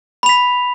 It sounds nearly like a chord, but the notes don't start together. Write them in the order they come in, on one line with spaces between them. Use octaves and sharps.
B5 F7 B6